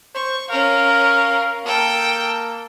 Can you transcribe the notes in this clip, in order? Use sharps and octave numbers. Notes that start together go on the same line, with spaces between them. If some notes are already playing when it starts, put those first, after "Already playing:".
C5 C#6
C#4 A#4 F5
A#3 A4 G5